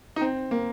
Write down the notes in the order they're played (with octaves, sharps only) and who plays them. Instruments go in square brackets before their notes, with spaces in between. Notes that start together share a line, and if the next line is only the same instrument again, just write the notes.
[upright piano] D#4
C4
A#3